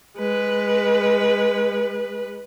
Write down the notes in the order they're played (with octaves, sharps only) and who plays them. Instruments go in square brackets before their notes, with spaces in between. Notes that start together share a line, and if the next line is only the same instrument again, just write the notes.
[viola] G#3 B4